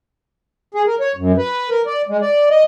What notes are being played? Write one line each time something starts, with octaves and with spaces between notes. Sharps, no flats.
G#4
A#4
C#5
F#2
B4
A#4
D5
G#3
D5
D#5